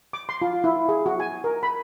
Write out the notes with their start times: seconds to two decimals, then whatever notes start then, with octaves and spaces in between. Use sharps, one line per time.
0.13 D6
0.29 C6
0.42 F4
0.64 E4
0.89 G#4
1.06 F#4
1.20 G#5
1.44 A#4
1.63 B5